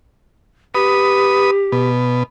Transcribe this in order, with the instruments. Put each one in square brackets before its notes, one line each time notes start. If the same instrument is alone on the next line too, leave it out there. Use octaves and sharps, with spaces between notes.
[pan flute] G4 [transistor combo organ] B4 D#6
[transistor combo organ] B2